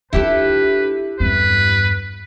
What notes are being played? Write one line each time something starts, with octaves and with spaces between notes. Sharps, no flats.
D4 E4 F4 G4 A4 B4
E2 G2 B4